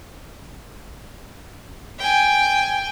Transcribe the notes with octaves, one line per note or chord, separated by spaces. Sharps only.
G5 G#5